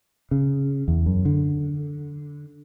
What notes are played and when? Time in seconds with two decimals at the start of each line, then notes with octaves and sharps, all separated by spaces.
0.31 C#3
0.88 E2
1.06 F#2
1.25 D3